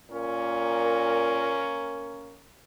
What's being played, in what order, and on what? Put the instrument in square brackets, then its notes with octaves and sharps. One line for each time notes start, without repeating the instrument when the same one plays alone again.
[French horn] A#2 [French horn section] A#3 C#4 A#4